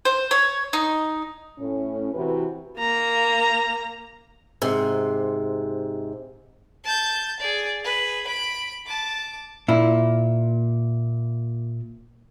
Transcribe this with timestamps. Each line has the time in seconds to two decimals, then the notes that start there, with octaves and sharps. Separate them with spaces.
0.05 C5
0.31 C#5
0.73 D#4
1.59 A2 C#4
2.14 C3 E3 F#4 B4
2.78 A#3 A#5
4.62 G#2 C3
6.84 A5 G6
7.40 G#4 D5
7.81 G#4 B4
8.28 B5 D7
8.87 A5 D6
9.68 A#2 E4